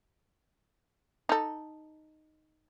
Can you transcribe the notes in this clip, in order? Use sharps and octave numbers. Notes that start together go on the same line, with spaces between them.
D#4 A4